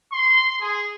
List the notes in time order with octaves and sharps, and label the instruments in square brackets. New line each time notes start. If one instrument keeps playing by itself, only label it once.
[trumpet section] C6
G#4